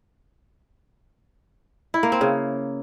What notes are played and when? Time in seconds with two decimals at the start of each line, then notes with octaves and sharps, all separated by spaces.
1.94 E4
2.03 A#3
2.12 C4
2.21 C#3